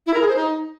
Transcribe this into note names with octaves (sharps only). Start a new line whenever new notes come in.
E4
A#4
G#4
C5
D#4